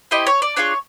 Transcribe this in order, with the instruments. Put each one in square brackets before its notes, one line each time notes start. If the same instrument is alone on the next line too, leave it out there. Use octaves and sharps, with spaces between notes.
[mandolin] C4 E4 G4 D#5
C#5
D5
D4 F4 G#4 C#5